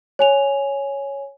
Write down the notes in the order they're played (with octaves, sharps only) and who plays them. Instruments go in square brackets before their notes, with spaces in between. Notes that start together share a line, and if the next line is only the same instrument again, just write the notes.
[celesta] C#5 G#5 F7